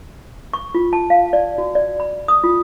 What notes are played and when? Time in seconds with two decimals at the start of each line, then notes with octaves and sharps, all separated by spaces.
0.54 C#6
0.75 F4
0.93 A5
1.10 F5
1.33 D5
1.58 F#4
1.75 D5
2.00 B5
2.28 D#6
2.44 F4